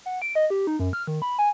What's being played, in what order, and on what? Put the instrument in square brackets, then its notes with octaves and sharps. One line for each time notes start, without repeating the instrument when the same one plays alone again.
[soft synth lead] F#5
D7
D#5
G4
D#4
F#2
F6
D#3
B5
G#5